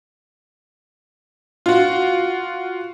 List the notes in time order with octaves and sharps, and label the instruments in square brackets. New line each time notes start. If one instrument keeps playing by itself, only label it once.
[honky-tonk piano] F4 F#4